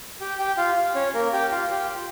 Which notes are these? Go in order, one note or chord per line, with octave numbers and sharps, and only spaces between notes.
G4 G5
G4 G5
F4 F5
C#4 C#5
A#3 A#4
G4 G5
F4 F5
G4 G5
F4